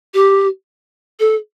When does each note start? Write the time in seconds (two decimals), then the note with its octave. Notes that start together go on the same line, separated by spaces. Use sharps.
0.14 G4
1.20 A4